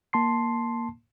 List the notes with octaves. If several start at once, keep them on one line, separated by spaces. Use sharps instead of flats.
A#3 A5 C6 C7